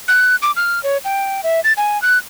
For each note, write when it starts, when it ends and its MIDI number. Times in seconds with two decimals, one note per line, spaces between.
0.08 0.36 90
0.42 0.52 86
0.56 0.82 89
0.83 0.98 73
1.05 1.41 79
1.43 1.60 76
1.64 1.73 93
1.77 2.00 80
2.02 2.18 90